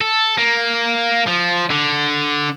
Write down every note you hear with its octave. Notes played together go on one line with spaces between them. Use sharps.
A4
A#3
F3
D3